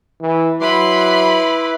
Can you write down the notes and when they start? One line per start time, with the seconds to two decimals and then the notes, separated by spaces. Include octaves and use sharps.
0.21 E3
0.61 F#3 E4 B4 B5 C6 D6